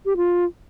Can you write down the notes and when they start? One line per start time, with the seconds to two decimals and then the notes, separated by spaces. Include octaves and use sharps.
0.06 G4
0.17 F4